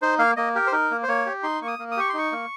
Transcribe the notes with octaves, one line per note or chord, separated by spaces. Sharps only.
D#4 C5
A#3 F5
A#3 D#5
G4 A#4
C5
D#4 A#4
A#3
C5
A#3 C#5
G4
D#4 C6
A#3 C#6
D#6
A#3
D#6
G4 C#6
C6
D#4 C#6
A#3